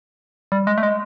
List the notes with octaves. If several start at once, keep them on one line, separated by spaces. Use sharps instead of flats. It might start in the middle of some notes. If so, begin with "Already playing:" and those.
G3
G#3
A3
G#3